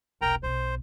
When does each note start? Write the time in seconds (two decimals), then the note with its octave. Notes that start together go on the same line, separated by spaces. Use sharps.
0.21 E1 B1 A#4 G5 A#5
0.43 B1 B2 C5